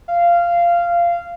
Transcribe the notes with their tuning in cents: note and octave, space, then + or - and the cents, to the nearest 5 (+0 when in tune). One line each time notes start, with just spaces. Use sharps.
F5 -15